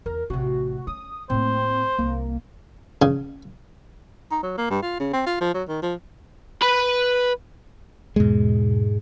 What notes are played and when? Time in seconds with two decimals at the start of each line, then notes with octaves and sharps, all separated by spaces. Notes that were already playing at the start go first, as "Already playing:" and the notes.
0.06 E2 A#4
0.30 A1 C3 F#4
0.87 C#4 D#6
1.30 A2 A#3 C4 C5
1.98 C2 A#3
3.02 C#3
4.31 D#4
4.43 F#3
4.58 A#3
4.70 G2
4.82 F4
5.00 C#3
5.13 C4
5.26 F4
5.41 F3
5.54 F#3
5.68 D#3
5.83 F3
6.63 B4 B5
8.16 E2 G#2 B2 G#3